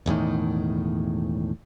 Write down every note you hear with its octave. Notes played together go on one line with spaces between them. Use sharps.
E1 E2 A2 D#3